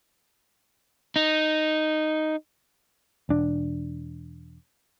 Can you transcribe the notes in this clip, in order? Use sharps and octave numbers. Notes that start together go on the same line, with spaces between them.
D#4
E1 D4